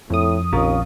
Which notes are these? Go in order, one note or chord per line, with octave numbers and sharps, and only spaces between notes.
F2 A2 D#6
A#1 D#2 C#3 F3 C#4 F4 A#4